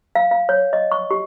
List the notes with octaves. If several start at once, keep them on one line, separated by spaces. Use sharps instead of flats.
F5
F5
C#5
D#5
C#6
G4